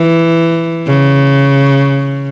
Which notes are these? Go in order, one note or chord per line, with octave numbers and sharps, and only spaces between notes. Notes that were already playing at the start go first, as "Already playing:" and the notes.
Already playing: E3
C#3